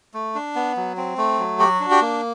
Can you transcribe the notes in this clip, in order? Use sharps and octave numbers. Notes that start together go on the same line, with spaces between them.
A3
D4
B3
F#3
C4
A3
F#3
F#4 G4
D4
G4
A#3